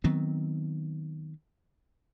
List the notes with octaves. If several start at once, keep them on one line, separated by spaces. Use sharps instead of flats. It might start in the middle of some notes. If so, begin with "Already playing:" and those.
D#3 F#3 B3 C4